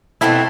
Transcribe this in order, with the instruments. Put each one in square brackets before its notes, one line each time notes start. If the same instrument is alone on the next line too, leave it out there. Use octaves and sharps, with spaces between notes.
[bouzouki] B2 A3 C4 F#4 [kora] E4